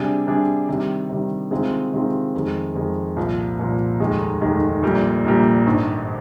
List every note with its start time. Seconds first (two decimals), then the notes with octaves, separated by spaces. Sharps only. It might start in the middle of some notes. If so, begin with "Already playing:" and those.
Already playing: C3 G3 D4 G#4
0.27 C3 G3 D4 G#4
0.69 C3 D#3 G3
1.09 C3 D#3 G3
1.51 C3 D#3 G#3 C4 F4
1.93 C3 D#3 G#3 C4 F4
2.35 F2 D#3 G#3
2.75 F2 D#3 G#3
3.16 C2 A#2 F3
3.59 C2 A#2 F3
4.00 F1 D#2 D#3 G#3 D#4
4.41 F1 D#2 D#3 G#3 D#4
4.83 A#1 A#2 G3
5.25 A#1 A#2 G3
5.66 G#1 G2 D#3